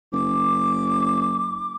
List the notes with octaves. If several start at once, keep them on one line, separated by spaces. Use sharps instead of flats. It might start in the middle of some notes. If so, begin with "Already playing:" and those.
F#1 D6